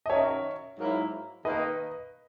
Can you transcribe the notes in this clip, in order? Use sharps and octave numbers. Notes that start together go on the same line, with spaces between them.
D#5
F#2 D#3 F#3 C#5 E5
G#2 F#3 A#3 E4
D#3 A#3 D#4 B4 D#5